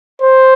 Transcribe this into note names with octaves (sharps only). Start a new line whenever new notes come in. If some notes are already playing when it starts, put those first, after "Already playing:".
C5